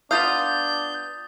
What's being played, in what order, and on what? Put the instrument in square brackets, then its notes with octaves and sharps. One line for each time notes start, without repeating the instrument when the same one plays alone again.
[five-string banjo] B3 F4 F5 [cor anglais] D4 [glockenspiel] D#6 A6 F7 [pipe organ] G6